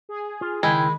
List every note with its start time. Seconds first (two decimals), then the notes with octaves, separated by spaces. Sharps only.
0.09 G#4
0.41 F4
0.63 C#2 D#3 G#3 E4 G5 B5